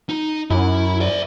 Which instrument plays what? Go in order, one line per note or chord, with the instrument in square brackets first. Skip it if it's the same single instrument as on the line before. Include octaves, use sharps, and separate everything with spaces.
[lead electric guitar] D#4
[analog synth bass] F#2 [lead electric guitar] E4
[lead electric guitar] D5 E5